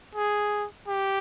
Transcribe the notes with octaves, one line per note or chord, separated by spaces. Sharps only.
G#4
G4